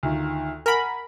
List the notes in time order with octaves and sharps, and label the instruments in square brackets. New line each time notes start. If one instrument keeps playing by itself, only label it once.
[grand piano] D2 D#3 F4
[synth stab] A#4 B5 [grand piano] F#5 G#5